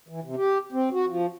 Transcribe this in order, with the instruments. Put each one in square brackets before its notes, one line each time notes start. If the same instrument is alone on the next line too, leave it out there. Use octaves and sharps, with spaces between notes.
[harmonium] E3
C3
G4
C4
F#4
F3